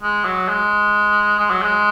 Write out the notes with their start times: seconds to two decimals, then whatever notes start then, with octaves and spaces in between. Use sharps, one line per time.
0.03 G#3
0.25 F#3
0.48 G#3
1.39 G#3
1.51 F#3
1.62 G#3